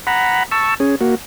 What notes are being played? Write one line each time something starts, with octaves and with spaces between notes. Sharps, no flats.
F#5 A#5 B5
A5 C#6 E6
C#4 G#4
A#3 F#4